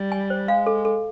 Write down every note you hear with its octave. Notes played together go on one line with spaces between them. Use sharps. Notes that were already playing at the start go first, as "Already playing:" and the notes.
Already playing: G3
G#5
C5
G#3 F5
A4
A4